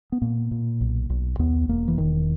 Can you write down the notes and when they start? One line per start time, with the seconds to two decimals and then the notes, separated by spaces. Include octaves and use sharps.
0.12 B3
0.22 A#2 A#3
0.51 A#2
0.81 B1
1.10 B1
1.39 D#2 B3
1.69 E1 A#3
1.88 E3
1.98 E1 D#3